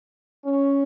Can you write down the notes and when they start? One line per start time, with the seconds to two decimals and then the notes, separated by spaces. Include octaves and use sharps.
0.45 C#4